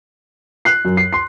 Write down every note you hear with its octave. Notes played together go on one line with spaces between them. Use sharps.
F#6 C7
F#2
C7
C6 C7